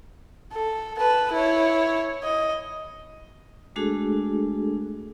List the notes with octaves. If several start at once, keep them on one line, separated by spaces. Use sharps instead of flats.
A4
B4 A5
E4 C#5
D#5
G#3 A3 D4 F#4 G#4 A4